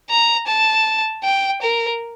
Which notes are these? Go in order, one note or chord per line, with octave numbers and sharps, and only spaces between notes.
A#5
A5
G5
A#4